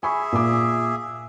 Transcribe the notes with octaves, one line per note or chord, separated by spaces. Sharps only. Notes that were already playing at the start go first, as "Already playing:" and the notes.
G#4 E5 G#5 B5 C#6
A#2 D6